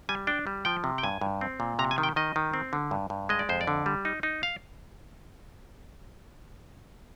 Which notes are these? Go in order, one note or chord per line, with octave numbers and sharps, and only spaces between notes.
G3 G#5
D4 G5
G3
F3 G5
C3
G5
G2 G#5
G2
C4
A#2
C3 A#5
G#5
D#3
G5
D#3 D#5
D#3
C4
D3
G2
G2
G#3 D#5
D5
F2 C5
D5
D3
G3
D#4
D#4
F5